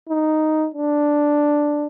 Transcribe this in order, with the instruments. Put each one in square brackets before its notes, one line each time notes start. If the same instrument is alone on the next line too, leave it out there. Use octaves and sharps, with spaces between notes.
[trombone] D#4
D4